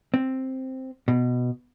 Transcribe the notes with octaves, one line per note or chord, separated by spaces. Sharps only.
C4
B2